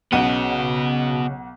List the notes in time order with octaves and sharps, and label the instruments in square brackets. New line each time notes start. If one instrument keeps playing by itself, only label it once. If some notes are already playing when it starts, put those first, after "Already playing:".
[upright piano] B1 F#5 D#7 [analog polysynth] C#3 [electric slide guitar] B3 F#4